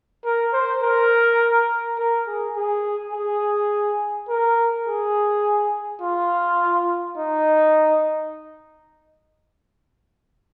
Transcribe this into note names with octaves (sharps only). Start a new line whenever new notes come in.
A#4
C5
A#4
A#4
G#4
G#4
G#4
A#4
G#4
F4
D#4